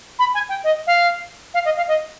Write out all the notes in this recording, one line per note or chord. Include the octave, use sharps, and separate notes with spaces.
B5
G#5
G5
D#5
F5
F5
D#5
F5
D#5